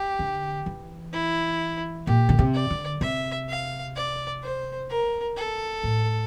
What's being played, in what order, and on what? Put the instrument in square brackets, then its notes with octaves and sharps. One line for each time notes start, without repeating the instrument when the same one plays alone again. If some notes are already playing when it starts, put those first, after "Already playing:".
Already playing: [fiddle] G4
[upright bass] D3
E3
[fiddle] E4
[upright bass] A#2 [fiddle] G4
[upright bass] D3
C3
[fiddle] D5
[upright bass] D3
[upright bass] C3 [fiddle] E5
[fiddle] F5
D5
C5
A#4
A4
[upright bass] A2